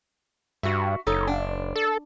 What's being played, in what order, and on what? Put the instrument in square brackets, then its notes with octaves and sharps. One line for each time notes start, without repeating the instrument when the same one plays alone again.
[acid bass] G2 [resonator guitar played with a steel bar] F#4 E5
[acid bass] F#1 [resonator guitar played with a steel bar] D#4 A4 C#5
[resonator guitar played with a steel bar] D4
[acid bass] A4